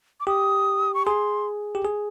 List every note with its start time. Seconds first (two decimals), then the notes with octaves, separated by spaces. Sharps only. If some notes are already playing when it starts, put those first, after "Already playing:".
0.20 D6
0.27 G4 D#6
0.94 C#6
1.06 G#4 C6
1.75 G4
1.85 G#4